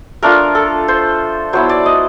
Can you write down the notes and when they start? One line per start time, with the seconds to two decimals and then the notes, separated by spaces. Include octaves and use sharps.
0.23 A3 D4 F4 A#4
0.55 A4
0.88 C5
1.53 F#3 B3 E4 C5
1.69 D5
1.86 D#5